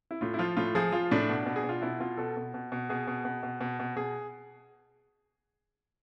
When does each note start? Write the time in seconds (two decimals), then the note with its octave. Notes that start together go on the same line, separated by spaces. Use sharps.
0.11 E4
0.21 A2 F4
0.34 E4
0.39 F3 F4
0.57 A2 F4
0.75 F3 G#4
0.92 F3 F4
1.11 A2 D4
1.29 B2
1.46 B2
1.56 G#4
1.64 B2
1.69 F4
1.82 B2 E4
2.00 B2 F4
2.18 B2 A4
2.37 B2
2.54 B2
2.72 B2
2.89 B2 G#4
3.07 B2
3.25 B2
3.43 B2
3.61 B2
3.80 B2
3.96 B2 G#4